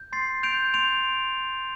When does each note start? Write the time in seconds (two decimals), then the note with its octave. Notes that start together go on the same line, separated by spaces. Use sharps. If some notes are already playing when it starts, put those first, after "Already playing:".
Already playing: G6
0.12 C6 A6 C7
0.43 G6 D7 F7
0.74 C6 D7 F7